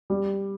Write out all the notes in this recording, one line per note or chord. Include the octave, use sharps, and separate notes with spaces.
G3